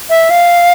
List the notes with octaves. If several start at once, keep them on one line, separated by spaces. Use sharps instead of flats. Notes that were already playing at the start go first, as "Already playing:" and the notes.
E5
F5